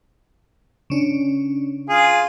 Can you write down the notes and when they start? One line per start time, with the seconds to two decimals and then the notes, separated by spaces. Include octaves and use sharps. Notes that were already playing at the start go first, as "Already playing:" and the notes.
0.90 C#3 C#4 D4
1.89 F4 G#4